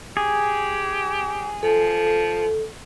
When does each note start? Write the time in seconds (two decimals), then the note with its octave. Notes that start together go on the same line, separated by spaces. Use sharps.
0.17 G4 G#4
1.63 F3 A4